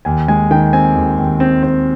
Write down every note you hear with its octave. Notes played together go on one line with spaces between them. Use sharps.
D#2 G#5
G#3 G#5
D#3 G5
C4 G#5
D#2
D#2
C4
C4